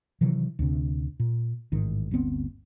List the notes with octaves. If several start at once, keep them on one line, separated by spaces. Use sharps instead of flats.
C3 D#3 E3 F#3
D2 C3
A#2
A1 G#2 D#3
G1 D2 B3 C4